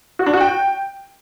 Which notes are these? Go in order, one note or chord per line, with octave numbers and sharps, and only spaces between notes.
F#4
D4
F#4
G5